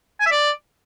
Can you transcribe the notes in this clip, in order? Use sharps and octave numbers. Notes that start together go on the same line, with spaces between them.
G#5
E5
D5